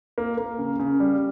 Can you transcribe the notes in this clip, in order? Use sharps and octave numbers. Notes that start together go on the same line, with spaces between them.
A#3
A#3
C#3
C#3
G3